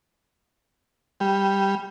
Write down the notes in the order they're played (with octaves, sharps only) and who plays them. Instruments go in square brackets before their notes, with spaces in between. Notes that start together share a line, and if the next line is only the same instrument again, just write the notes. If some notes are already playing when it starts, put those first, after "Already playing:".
[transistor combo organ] G3